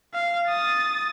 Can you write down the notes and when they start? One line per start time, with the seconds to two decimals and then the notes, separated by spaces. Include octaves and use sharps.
0.14 F5
0.47 D#6 A6